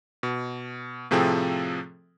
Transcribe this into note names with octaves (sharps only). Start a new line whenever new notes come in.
B2
A2 C3 F3 C4 G#4 A4